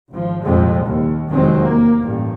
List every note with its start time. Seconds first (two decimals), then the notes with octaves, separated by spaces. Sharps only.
0.13 G#1 F3
0.44 C2 F2 A#2 G#3
0.87 D#2
1.30 F1 E2 D#3 F#3 G#3 C4
1.62 A#3
2.01 A1 G2